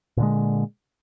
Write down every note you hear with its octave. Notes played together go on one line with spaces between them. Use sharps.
A#2 D3 G#3